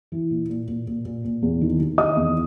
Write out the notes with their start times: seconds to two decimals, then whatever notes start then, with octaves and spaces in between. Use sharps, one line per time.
0.12 E3
0.31 A#2
0.49 A#2
0.68 A#2
0.87 A#2
1.05 A#2
1.25 A#2
1.42 E2
1.61 D#3
1.80 D#3
1.98 D#3 D#5 D#6
2.17 E2